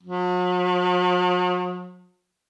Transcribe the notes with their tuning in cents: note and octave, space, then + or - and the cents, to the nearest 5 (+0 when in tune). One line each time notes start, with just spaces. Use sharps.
F#3 -45